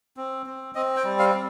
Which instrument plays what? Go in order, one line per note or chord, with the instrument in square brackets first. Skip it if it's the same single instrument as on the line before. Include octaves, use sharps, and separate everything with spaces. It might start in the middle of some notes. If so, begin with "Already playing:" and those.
[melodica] C4
C4
C4 D#5
G5
G3
F5
G3